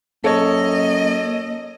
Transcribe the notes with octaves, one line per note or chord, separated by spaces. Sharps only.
F#2 A#3 A4 C#5 D#5